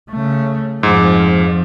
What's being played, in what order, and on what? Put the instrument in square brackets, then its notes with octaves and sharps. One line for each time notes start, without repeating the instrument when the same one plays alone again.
[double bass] C#3 A3
[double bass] F2 F3 [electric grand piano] G#2